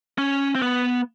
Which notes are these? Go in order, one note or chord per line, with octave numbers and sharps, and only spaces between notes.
C#4
C4
B3